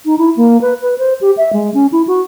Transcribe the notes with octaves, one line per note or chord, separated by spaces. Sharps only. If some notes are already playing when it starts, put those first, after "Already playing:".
D#4
E4
A#3
B4
B4
C5
G4
E5
G#3
C#4
E4
F#4